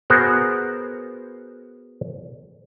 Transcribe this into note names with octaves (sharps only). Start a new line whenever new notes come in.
B3 F#4 G#4 A#4 C5